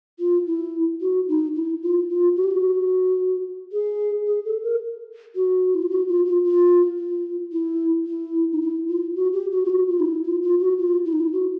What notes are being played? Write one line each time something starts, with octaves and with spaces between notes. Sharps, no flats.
F4
E4
F#4
D#4
E4
F4
F4
F#4
G4
F#4
G#4
G#4
A4
A#4
F#4
E4
F4
F#4
F4
F4
F4
F4
E4
E4
D#4
E4
F4
F#4
G4
F#4
F4
F#4
F4
D#4
E4
F4
F4
F#4
F4
E4
D#4
E4
F#4